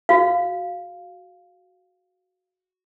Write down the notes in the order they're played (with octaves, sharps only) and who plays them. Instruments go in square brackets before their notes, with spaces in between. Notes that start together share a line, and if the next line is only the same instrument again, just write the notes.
[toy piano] F#4 F5